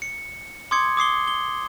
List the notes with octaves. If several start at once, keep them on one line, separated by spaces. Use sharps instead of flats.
C#7
C6 D6 D#6 G#6 C#7
D6 D#6 C7 G7
G7